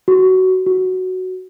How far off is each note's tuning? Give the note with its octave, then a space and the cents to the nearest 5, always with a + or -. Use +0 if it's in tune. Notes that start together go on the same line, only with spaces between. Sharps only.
F#4 +15
F#4 +5